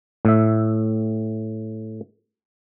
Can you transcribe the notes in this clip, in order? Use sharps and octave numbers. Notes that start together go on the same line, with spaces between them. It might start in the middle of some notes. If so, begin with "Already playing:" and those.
A2 E5